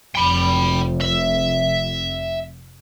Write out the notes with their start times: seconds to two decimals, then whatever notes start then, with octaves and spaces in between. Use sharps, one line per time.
0.16 F1 G5 B5
1.01 E5